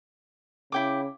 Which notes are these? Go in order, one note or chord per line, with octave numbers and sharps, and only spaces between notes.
C#3 E4 G5 D6